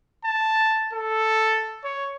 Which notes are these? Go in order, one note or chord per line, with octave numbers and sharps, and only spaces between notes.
A5
A4
C#5